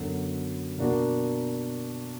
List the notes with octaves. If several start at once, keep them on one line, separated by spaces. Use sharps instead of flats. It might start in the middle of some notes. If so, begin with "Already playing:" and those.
Already playing: F#2 D3 F#3 B3 F#4
B2 A#3 D4 F#4 A#4